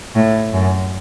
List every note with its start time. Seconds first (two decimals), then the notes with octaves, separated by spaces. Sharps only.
0.15 A2
0.53 F#2